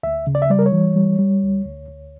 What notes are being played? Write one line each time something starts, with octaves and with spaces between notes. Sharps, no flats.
D2 E5
C#3
D5
E5
G3 D5
A#4
C#5
E3
G3
G3
D2
D2
D2